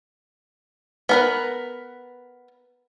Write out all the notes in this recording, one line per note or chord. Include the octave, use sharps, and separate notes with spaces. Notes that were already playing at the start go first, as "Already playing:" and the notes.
B3 A#4 B4